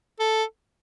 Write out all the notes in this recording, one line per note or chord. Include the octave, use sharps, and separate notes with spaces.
A4